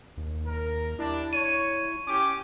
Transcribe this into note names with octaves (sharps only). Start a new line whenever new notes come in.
D#2
A#4
G3 D4 E4
C#5 D#7
C#4 G4 D6